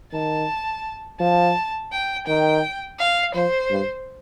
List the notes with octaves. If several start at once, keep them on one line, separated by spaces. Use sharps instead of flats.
D#3 A5
F3 A5
G5
D#3 G5
F5
F3 C5
G2